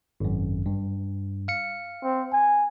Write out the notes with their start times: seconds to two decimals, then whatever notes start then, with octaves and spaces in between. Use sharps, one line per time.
0.20 G#1 F#2
0.66 G2
1.48 F5 C#7
2.03 C4
2.32 G#5